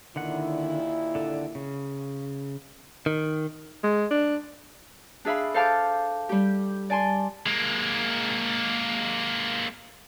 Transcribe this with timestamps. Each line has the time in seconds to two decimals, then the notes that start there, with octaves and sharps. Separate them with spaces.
0.16 D#2 A#2 D3 D#3 E4 F#5
1.15 D3 A4
1.55 C#3
3.06 D#3
3.84 G#3
4.11 D4
5.25 D4 G#4 E5 F5 B5
5.54 A4 C5 F5 A5 D6 F6
6.29 G3 G4
6.90 D5 G#5 A5 C6
7.46 G#3 A#3